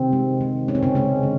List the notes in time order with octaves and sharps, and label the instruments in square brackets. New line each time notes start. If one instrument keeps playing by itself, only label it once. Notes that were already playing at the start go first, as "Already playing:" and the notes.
Already playing: [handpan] C3 D#3 C4
G#3
D#3
G#3 C#4
C4
C#3 C#4
C#3 G#3 C#4
D3